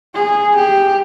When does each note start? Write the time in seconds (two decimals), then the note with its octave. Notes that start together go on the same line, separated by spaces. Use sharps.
0.14 G#4
0.56 G4